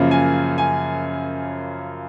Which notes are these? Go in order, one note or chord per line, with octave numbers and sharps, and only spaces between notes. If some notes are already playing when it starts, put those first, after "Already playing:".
Already playing: F#2 C#3 F3 A#3
G#5
G#5